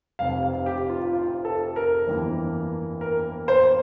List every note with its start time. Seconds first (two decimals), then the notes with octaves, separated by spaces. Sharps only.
0.19 F1 F2 C3 F5
0.43 F5
0.66 G4
0.90 F4
1.13 F4
1.45 A4
1.76 A#4
2.07 G1 F2 E3 A#3
3.01 A#4
3.48 C5